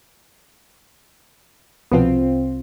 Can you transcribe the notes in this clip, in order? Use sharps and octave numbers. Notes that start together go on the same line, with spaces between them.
C2 B2 F3 B3 C4 F4